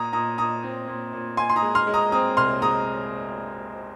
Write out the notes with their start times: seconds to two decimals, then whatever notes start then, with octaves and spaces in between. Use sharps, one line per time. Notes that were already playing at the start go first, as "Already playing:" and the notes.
Already playing: A#2 A#5 D#6
0.13 A#2 A#5 D#6
0.38 A#2 A#5 D#6
0.63 C4
0.87 A#2
1.13 A#2
1.37 A#2 G#5 C6
1.49 C6
1.56 A#5 D#6
1.63 G#3
1.75 C6 F6
1.87 G#3
1.94 A#5 D#6
2.12 C4 A#5 D#6
2.37 C2 C6 F6
2.62 G#3 A#5 D#6